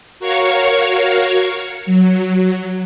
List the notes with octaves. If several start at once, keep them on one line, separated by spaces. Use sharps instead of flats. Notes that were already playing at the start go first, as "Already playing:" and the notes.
F#4 A#4 C#5 F5 C#6
F#3